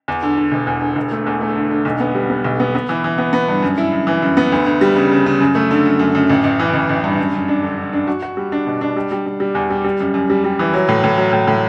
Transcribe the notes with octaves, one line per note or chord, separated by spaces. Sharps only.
E2
D3
D3
E1
E2
D3
E1
A3
E2
A3
D3
D3
B1
B3
G3
B3
B1
B3
B3
E3
E3
B3
B3
G2
F#2
E4
F#2
E3
F#2
B3
D2
D2
G3
C#3
C#3
C#3
F#2
A3
D3
F#2
F#2
F#2
A1
A1
E3
A1
A1
G2
F#2
F#2
D4
D3
D3
D4
F#4
F#4
G3
D4
B2
D4
G3
G3
G3
G3
E2
G3
G3
F#2
F#2
G3
G3
E3
F#3
A2
A2
F#3
A2
A2